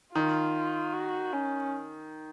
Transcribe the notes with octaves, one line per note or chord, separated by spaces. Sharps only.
D#3 F4
F#4
C#4